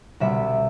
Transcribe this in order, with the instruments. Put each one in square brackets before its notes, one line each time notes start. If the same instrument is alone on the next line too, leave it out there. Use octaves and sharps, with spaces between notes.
[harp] C2 B2 G3 B3 E5